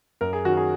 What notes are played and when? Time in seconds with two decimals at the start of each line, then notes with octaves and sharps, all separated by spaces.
0.21 F#2 A#4
0.33 G#4
0.45 D#3 F#3 C#4 F#4
0.57 G#4